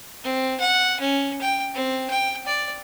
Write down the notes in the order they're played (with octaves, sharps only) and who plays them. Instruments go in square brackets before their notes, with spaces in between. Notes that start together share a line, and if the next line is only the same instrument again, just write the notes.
[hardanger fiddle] C4
F#5
C#4
G5
C4
G5
D5